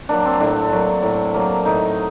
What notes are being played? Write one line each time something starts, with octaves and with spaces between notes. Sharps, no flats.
F#3 A#3 D4
C4
A2 D4
F#3 A#3
A2
F#3 A#3
A2 D#4